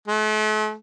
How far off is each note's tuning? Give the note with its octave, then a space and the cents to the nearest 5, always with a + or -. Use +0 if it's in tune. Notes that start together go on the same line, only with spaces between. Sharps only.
A3 -40